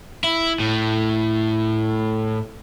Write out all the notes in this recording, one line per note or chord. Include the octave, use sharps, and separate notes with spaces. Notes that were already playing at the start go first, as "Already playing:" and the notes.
E4
A2